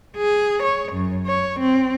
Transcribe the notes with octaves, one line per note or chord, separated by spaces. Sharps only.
G#4
C#5
F#2
C#5
C4